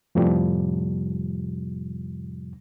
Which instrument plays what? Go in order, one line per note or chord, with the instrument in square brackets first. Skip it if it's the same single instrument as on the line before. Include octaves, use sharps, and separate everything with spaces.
[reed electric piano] F2 A2 C3 F3 G3